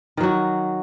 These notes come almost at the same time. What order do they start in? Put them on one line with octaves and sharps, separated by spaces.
D#3 F#3 F#4